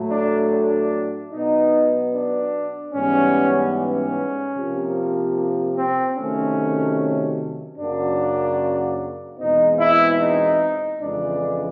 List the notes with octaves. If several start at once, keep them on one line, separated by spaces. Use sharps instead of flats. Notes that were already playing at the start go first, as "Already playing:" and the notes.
Already playing: A2 F#3 A3
D4
D4
B2 F#3 B3 D#4
D4
G#2 E3 G3 B3 C#4
C#4
C3 F3 A#3
C4
C3 D#3 F#3 A3 C#4
F#2 C#3 F#3 A#3 D4
E2 B2 G#3 C4 D#4
E4
D#4
F2 C#3 E3 G#3 D4